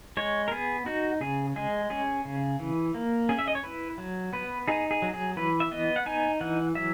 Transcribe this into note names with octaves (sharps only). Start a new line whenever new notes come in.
G#3 C#5
A#4
B3 G#4
D#4 F#4
C#3 G#4
G#3 G#4
C#4 G#4
C#3
E3
A#3
C#4 G#4
E5
D#5
C#5
E4 B4
F#3
B3 B4
D#4 G#4
G#4
F#3
G#4
E3 B4
E5
B3 D#5
F#5
D#4 G#5
E3 F#5
F#3 E5